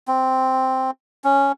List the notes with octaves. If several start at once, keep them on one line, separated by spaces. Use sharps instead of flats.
C4
C#4